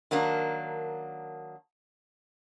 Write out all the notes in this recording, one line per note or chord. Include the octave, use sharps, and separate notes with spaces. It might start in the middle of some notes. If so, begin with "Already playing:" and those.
D#3 F#3 A#3 D4